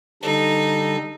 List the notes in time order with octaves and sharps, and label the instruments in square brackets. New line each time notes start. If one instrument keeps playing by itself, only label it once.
[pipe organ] D3 G3 A4 [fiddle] D#4